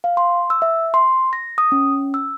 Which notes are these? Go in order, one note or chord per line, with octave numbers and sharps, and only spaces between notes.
F5
C6
E6
E5
C6
A#6
D#6
C#4
E6